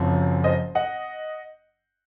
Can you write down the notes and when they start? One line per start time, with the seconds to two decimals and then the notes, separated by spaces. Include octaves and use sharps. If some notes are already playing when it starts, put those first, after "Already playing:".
Already playing: F#1 F#2 F3 C4
0.44 C5 D#5
0.75 D#5 F#5